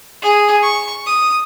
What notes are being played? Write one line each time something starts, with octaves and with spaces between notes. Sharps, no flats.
G#4
C#6
D#6